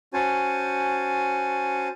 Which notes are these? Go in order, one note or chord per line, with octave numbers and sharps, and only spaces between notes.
C#4 F#4 C5 G#5 A5